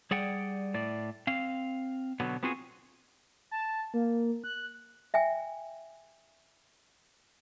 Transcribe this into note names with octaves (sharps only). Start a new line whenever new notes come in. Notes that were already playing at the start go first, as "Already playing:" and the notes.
G3 G#4 D5 F#5 G5
A2 D5
C4 F5
B2 D3 F#3 B3
B3 C4 F4 F#4 G#4
A5
A#3
F#6
E5 G5 G#5